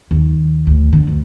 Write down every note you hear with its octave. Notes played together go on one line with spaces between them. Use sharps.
D#2
D2
D3
D2